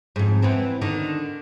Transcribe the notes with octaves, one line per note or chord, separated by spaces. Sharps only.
F2 G#2
E3 B3 C4
D3 D#3